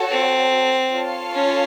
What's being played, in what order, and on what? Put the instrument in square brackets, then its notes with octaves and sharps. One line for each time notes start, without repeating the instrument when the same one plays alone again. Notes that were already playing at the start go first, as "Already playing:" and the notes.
Already playing: [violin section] F#4 A4 C#5 A5
[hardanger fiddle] C4
[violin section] F4 A4 C#5 F5 A5
[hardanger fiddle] C#4